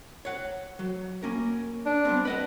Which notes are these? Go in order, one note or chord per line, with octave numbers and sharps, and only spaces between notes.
C#5 F#5
F#3
A#3 C#4 A#4
D4
G3 B3 C4
B4 D#5 F#5